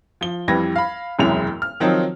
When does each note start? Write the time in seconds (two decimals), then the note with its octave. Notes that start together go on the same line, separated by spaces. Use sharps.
0.21 F3 G7
0.48 F2 E3 G3 B4 G#6 A#6
0.76 F5 B5
1.19 E1 C2 F#2 G#3 E4 F7
1.62 F6
1.80 D#3 F3 F#3 C4 D#4